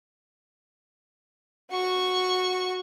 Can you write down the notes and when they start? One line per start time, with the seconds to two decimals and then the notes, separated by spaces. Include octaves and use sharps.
1.71 F#4 C#6